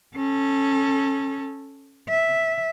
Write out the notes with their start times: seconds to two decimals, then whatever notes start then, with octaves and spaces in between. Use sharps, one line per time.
0.16 C#4 A4
2.09 E5